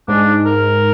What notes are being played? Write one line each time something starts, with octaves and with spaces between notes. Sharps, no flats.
G#2 D4
A#4